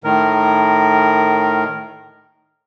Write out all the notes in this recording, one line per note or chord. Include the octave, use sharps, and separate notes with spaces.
A2 D#3 A#4